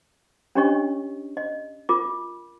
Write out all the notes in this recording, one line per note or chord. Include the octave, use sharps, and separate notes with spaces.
C#4 D4 G4 C#5 D#5 C#6
D#5
F4 A#4 D6